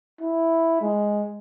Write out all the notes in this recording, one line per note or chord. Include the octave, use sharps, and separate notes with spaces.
E4
G#3